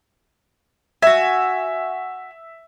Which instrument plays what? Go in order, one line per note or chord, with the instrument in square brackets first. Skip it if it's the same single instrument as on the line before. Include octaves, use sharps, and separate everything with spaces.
[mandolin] F#4 G#5 [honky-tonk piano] E5